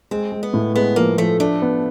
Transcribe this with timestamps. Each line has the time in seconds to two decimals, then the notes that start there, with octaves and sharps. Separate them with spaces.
0.11 G#3 C4
0.32 G#3
0.43 B3
0.54 A2
0.75 G#3 B3
0.96 F3 A#3
1.18 F3 A3
1.40 A3 D4
1.62 B3